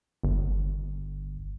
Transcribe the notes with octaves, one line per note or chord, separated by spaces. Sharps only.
G1